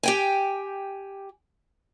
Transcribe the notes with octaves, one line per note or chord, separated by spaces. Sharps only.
G4 G5 G#5